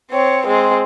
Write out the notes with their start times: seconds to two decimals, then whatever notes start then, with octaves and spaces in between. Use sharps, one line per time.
0.11 C4 C#5
0.47 G#3 C4